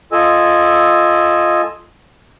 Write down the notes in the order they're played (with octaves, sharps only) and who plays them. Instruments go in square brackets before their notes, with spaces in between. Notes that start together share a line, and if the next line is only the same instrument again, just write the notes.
[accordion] F4 A4 D#5 G#5 E6